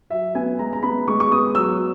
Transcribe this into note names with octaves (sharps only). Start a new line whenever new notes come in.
F#3 E5
B3 G#5
G#3 A#5
A#5
B3 B5
G#3 C#6
C#6
B3 D#6
F#3 E6